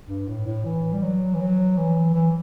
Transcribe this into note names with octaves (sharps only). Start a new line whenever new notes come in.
G2
A2
A2
E3
G3
F#3
E3
F#3
E3
E3